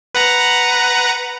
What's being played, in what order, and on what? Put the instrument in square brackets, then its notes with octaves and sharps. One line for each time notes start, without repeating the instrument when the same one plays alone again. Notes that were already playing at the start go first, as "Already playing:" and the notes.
[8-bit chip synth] B4 F#5 A#5